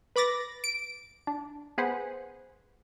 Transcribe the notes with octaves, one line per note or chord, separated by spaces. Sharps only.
B4 B5 D6 A6 A#6
D7
D4
B3 G#4 B4 C5 F#5